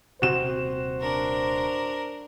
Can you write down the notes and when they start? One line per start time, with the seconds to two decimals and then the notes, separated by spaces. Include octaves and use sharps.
0.22 D#1 C3 C4 F#4 C5 E7
1.01 D4 A#4